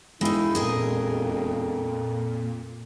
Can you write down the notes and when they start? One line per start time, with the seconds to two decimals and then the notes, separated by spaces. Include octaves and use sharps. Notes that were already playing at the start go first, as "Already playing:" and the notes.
0.21 E1 G#3 D#4 E4
0.55 F2 A#2 G#4 A#4 D#5